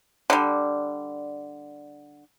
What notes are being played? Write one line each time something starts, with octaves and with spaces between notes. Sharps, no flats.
D3 G3